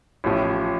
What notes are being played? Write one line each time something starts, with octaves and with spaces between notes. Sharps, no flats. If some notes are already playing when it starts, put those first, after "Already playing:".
A1 A2 F3